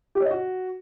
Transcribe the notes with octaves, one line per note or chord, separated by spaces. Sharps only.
G4
C#5
D#5
F#4